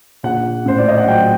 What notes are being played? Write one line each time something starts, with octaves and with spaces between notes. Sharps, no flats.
A#1 F#5
A2 C5
D5
D#5
F#5
F#3 G5